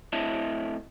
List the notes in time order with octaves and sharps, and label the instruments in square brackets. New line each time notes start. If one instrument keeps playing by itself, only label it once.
[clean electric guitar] A2 C4 E4 D#5 E5 A5